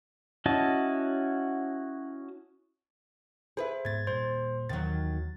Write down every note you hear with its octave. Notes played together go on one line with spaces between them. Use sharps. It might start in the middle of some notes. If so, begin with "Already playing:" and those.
C#4 E4 F#4 D#5 A5
G#4 B4 C5 E5
G#2 B3 G#6 A6
A#2 G3 C5 C6
D#2 D#3 E3 F#3 A6